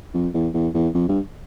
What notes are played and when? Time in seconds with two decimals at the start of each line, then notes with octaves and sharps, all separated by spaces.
0.14 F2
0.34 E2
0.54 E2
0.74 E2
0.95 F2
1.09 G2